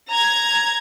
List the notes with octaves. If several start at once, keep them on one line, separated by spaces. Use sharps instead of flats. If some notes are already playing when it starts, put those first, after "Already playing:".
A#5 G#6